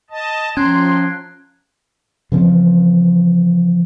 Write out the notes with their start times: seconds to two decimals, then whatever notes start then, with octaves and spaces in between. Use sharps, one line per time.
0.10 D#5 A5
0.57 F3 C#4 G5 A#5 C6 F#6 G#6
2.32 C#3 E3 F3 C4